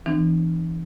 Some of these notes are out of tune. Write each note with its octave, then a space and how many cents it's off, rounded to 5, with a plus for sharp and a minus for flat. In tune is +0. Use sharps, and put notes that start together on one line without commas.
E3 +5 C4 -25 D#4 -45